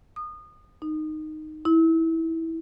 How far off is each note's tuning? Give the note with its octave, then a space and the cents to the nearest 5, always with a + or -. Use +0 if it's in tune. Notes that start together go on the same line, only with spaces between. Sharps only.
D#6 -25
D#4 -10
E4 -15